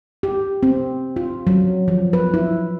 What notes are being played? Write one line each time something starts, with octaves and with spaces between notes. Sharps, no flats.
G4
C4
F4
F#3
F3
B4
E4